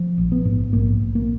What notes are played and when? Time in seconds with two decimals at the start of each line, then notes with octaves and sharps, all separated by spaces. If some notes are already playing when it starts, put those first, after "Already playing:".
Already playing: F3
0.18 A#1
0.32 B3
0.45 G#2
0.73 A#1 A#3
1.01 A#1
1.15 A#3